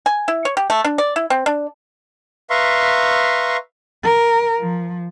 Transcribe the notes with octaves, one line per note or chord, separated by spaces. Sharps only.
G#5
E4
C#5
G4
A3
D4
D5
E4
C4
D4
B4 E5 F5 A#5 C6 C#6
A#4
F3